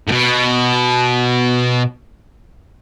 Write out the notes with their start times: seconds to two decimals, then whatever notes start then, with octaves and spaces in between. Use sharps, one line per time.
0.08 A2
0.12 B2